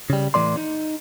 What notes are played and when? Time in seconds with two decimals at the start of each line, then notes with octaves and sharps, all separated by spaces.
0.10 C#3 G3
0.34 A2 E3 A3 D5 C6
0.57 D#4